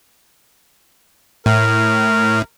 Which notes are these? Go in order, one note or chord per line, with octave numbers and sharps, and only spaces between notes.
A2 A#4